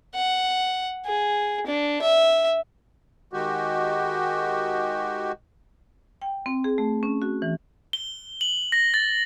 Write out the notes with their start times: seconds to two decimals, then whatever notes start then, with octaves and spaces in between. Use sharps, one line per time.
0.15 F#5
1.06 G#4
1.67 D4
2.02 E5
3.33 D#3 G#3 F#4 G4
6.22 G5
6.46 C4
6.64 G#4
6.78 A3
7.03 C#4
7.22 F#4
7.42 E3
7.93 G7
8.41 F#7
8.72 A#6
8.94 A6